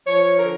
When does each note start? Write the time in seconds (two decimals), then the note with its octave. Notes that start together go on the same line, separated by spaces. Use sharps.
0.07 F3 C#5
0.38 D3 A#4